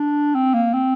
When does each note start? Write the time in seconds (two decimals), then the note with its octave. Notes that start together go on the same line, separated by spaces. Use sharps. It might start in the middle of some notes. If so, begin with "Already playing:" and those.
Already playing: D4
0.35 C4
0.54 A#3
0.74 C4